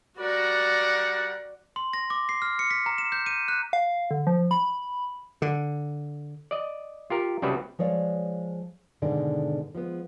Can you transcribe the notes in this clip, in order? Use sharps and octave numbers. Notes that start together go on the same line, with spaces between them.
G3 F#4 A#4 D5 F#5
C6
A#6
D6
C7
F6
C#7
B6
A#5
E7
G6
D#7
F#6
F5
D3
F3
B5
D3
D5 D#5
F4 G4 A#4
C2 C#3 G3 F#4 B4
F3 G#3 C#5 D5 F5
G#2 B2 D3 D#3 G#4 D5
F3 G#3 B3